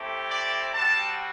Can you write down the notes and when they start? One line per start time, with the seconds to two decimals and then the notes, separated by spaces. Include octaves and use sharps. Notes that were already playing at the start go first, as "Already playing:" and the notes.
Already playing: A3 C4 E4 G4
0.29 D5
0.74 G3 C4 F#4 A5